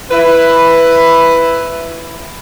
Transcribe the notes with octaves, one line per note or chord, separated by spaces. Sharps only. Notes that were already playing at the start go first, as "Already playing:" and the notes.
E4 B4